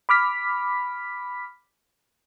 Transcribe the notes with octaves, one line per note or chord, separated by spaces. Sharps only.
B5 D6 F6 B6